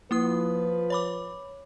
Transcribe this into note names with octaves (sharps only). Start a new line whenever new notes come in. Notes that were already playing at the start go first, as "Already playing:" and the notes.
F3 A#3 E4 B4 D#6
C#5 B5 D6